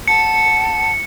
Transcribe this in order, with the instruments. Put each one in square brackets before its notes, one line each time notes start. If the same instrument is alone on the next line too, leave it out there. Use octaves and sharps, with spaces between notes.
[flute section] F#5 A5 [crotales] C#7